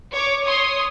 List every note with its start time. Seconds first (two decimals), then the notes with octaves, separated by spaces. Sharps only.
0.13 C#5 D6
0.45 C#5 C6 D#6